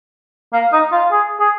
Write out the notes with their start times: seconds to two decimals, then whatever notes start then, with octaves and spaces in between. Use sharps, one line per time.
0.53 A#3
0.73 D#4
0.92 F4
1.12 G#4
1.40 G#4